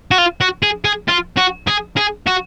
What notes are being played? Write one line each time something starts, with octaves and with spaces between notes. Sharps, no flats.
F#4
F4
F#4
G#4
G#4
F4
F#4
G#4
G#4
F#4